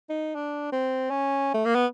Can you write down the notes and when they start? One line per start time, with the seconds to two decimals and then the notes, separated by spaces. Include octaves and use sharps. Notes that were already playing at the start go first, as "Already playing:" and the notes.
0.09 D#4
0.35 D4
0.72 C4
1.11 C#4
1.54 A3
1.65 A#3
1.75 B3